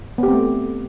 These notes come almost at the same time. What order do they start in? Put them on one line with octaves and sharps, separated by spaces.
B3 G4 C4 A3